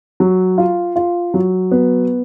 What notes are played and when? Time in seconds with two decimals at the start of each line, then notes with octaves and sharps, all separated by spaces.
0.20 F#3
0.58 F4
0.96 F4
1.34 F#3
1.71 B3